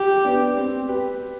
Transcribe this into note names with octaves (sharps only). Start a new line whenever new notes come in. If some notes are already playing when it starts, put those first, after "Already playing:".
Already playing: G4
B3 D4
C4
G4 B4